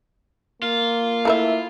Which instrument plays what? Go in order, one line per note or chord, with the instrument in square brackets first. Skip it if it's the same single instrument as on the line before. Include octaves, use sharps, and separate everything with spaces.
[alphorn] A#3 [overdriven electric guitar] F4
[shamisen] A3 A#4 E5 [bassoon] E4